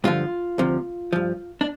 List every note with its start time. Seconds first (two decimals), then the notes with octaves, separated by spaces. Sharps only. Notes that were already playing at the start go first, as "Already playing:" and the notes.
0.04 G2 D3 F3 F4
0.58 D2 C3 F3
1.13 G2 F3
1.61 D4